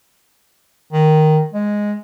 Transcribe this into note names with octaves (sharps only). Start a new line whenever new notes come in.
D#3
G#3